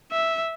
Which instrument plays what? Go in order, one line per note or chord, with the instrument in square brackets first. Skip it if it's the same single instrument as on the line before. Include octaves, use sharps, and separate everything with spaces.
[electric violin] E5